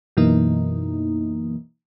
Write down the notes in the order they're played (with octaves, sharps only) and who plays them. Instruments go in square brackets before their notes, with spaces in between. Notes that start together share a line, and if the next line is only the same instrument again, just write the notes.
[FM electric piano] F#2 B2 E3 A#3 D#4